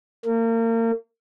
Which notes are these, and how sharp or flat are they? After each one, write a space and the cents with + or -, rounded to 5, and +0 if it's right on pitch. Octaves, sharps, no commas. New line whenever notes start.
A#3 -35